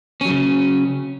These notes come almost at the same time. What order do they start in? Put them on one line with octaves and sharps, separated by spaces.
C#4 F#3 C#3